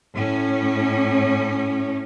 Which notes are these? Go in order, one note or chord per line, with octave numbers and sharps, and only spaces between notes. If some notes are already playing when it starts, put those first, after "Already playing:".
A2 C#4